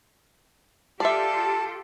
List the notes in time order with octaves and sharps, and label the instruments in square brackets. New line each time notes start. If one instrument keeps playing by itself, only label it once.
[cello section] F4 G4 A4 [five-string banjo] D5 E5 [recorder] A5